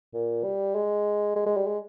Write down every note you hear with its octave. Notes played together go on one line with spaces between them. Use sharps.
A#2
G3
G#3
G#3
G#3
G3
G#3